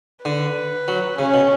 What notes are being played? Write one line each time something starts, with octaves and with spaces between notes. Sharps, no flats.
D3 B4
F#3
C#3 C#4
B2